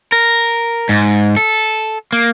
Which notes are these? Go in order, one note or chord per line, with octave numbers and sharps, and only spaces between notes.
A#4
G#2
A4
A#3